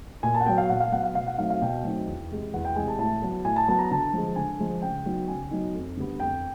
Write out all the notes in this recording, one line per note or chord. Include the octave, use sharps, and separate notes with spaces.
A#2 G#5
A5
F#5
F#3 B3 G5
F5
A#2 F#5
F5
F#3 B3 F#5
F5
B2 F5
F#5
F#3 A3 C4 D#4 F5
F5
B2 G5
F#3 A3 C4 D#4
E2
C3 E3 G#3
E2 F#5
G5
C3 E3 G#3 G#5
A5
A2 A5
F#3 B3
A2 G#5
A5
F#3 B3 A5
A#5
D3 A5
F3 G#3
D3 G#5
F3 G#3
C#3 G5
F#3 B3 D#4
C#3 G#5
F#3 B3 D#4
F2
D3 G3 B3
F2 G5